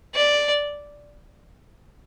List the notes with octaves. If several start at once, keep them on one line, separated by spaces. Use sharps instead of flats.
D5